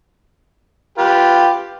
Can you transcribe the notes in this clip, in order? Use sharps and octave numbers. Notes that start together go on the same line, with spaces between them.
F4 G4 B4